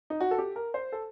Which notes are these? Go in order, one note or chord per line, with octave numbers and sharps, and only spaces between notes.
D#4
F#4
A4
G4
A#4
C5
A4